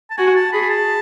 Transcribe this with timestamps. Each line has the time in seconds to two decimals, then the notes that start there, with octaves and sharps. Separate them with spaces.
0.10 A5
0.17 F#4 G#5
0.36 A5
0.53 G#4 B5
0.70 A5